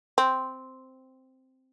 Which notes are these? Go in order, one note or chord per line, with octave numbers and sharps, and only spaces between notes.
C4